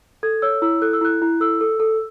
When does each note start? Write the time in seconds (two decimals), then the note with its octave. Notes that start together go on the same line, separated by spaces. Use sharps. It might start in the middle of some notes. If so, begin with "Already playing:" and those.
0.23 A4 G#6
0.42 C#5 E6
0.62 E4 E6
0.82 A4 F#6
0.93 E6
1.01 E4 F#6
1.22 E4
1.40 A4 E6
1.61 A4
1.80 A4